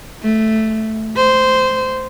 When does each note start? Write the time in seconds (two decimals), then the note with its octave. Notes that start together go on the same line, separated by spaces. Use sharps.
0.22 A3
1.17 C5